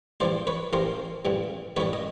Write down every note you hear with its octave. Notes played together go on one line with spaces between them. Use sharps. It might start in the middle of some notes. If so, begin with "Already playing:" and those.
A1 G2 E3 G3 C5 D5
B4 C#5
A1 G2 E3 G3 A#4 C5
A1 G2 E3 G3
A1 G2 E3 G3 B4 C#5
D#5